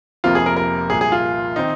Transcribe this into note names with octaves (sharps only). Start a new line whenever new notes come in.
F1 F2 C3 F3 A#3 F4
G#4
A#4
A#4
C2 A#2 A#3 G#4
G#4
F4
D#3 C4 D#4